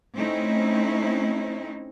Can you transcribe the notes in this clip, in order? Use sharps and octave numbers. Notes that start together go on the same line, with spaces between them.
A3 C4 C#4 D#4 E4